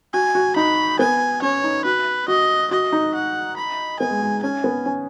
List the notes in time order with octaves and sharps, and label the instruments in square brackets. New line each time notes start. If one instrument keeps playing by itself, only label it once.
[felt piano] F#4 [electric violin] G#5
[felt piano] F#4
[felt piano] D#4 [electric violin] B5
[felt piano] B3 [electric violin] G#5
[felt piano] C#4 [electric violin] C#5
[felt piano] D#4
[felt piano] F#4 [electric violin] B4
[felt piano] F#4 [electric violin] D#5
[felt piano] F#4 [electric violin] D#5
[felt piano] D#4
[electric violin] F#5
B5
[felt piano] B3 [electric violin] G#5
[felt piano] G#3
G#3
[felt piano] C#4 [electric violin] G#5
[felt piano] B3
C#4